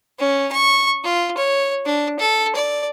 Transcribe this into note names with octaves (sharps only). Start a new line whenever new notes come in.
C#4
C#6
F4
C#5
D4
A4
D5